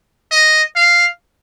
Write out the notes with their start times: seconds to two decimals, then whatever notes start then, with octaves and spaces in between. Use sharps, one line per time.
0.31 D#5
0.76 F5